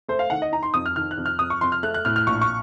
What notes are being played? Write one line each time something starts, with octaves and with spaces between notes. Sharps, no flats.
A3 C5
F5
D#3 F#5
D#5
D#4 A#5
C6
F2 D#6
F6
D#3 F6
F#6
F2
F6
F2 D#6
C#6
F2 C6
F6
A3 F#6
F#6
A2 F6
F6
A#1 C#6
C#6